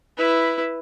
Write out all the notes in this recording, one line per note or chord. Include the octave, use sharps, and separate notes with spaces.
E4 B4